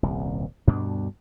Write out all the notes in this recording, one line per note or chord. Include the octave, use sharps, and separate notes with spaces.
D#1 C2
D2 G2 B2 D4